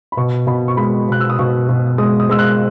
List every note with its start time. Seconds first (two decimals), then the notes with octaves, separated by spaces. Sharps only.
0.12 B5
0.17 B2 C#6
0.47 B2 B5
0.68 C#6
0.77 G#3 B5
1.09 B2 F#6
1.20 E6
1.30 D#6
1.39 B2 C#6
1.69 B2
1.98 G#3 D#6
2.20 D#6
2.29 G#3 E6
2.39 F#6